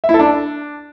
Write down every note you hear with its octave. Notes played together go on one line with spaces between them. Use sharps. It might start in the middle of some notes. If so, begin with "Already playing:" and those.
E5
E4
A4
D4